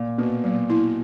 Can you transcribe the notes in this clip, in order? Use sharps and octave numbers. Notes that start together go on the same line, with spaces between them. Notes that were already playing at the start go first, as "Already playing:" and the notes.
Already playing: A#2
B2 A#3
A#2 F#3
E4